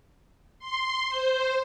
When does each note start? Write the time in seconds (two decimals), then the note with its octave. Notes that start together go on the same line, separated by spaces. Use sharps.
0.59 C6
1.09 C5